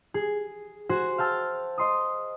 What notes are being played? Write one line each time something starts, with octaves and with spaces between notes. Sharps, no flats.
G#4
F#4 C5 G#5
F5 G5 A5 E6
D#5 C6 D#6